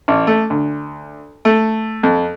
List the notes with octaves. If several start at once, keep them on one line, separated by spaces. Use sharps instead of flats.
A1
A3
D2
A3
F2